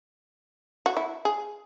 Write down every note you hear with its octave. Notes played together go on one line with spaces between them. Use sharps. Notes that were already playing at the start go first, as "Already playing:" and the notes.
F#4
E4
G#4